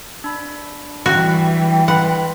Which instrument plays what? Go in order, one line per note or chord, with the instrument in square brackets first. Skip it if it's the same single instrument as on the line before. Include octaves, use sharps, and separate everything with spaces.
[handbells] D4 B5
[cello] E3 G3 [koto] F#4 [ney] G5
[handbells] B4 B5 C6 [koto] F#5